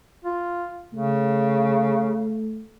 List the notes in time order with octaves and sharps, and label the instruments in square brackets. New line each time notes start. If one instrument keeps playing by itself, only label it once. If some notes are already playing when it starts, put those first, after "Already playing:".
[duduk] F4
[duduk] C#3 [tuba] A3